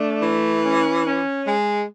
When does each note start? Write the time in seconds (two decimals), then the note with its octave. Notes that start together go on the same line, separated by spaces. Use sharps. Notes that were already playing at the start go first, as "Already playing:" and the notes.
Already playing: A3 D4
0.22 E3
0.63 C#4
1.06 C#4
1.46 G#3